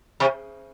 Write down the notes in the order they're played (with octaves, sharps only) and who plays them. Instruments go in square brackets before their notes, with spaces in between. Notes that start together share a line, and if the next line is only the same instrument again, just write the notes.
[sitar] C3